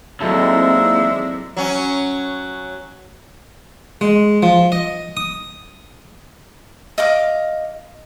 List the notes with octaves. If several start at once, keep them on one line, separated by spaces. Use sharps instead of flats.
D#2 F#3 G#3 C4 E4 A4 D5 E5
F#3 C#4
G#3
F3
D#5
D#6
D#5 F5 D6